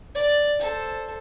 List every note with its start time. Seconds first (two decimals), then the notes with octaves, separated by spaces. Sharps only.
0.15 D5
0.59 A4 C5